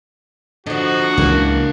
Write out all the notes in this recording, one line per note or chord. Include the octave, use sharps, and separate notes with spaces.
D3 F3 D4 F#4 D#5
C#2 C#3 E3 A#3 B3